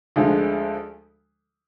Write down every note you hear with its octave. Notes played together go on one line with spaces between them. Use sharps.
D2 D3 F3 G#3